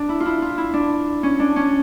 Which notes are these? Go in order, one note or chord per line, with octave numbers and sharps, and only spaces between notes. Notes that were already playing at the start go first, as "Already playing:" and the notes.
Already playing: D4
E4
F4
E4
F4
E4
D4
C#4
D4
C#4